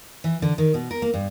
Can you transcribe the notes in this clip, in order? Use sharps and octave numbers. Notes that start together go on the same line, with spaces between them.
E3
D3
D#3
B2
A#4
A#3
G2